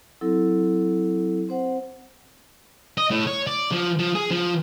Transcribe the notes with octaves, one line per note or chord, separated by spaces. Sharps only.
F#3 C4 E4 A4
C4 C5 F#5
D#5
A2
C#5
D5
F3
F3
G#4
F3